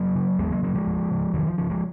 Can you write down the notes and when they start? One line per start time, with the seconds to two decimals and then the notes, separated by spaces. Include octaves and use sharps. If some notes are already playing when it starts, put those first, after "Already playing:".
Already playing: F#3 A#3
0.15 C#3
0.39 D#2 G#3 B3
0.51 F#3 A#3
0.63 C#3 F#3 A#3
0.75 F3 G#3
0.87 F2
1.11 C#3
1.34 F2 D#3 F#3
1.46 F3
1.58 C#3 F3
1.70 F3 G#3